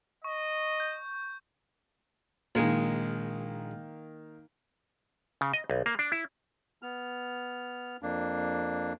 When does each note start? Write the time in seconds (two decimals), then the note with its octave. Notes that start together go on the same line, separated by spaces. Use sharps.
0.24 D#5 C#6
0.80 G6
2.55 A#1 D#3 G#3 A#3 G#5
5.41 C#3
5.54 D#5
5.70 B1
5.86 A#3
5.99 D4
6.12 E4
6.82 B3 F6
8.02 F2 A#3 D4